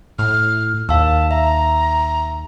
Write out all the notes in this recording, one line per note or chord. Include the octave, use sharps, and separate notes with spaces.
A2 F6
D#2 F5 A5 E6
E5 A#5